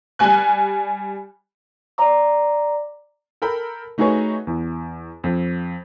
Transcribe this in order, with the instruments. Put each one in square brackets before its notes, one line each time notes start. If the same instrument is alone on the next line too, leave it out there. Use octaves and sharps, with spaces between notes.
[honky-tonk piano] G3 G#5 F#6
[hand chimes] D5 A#5 D6
[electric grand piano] A4 A#4 G5 B5
A3 D#4 F#4 G#4 B4 C#5
E2
F2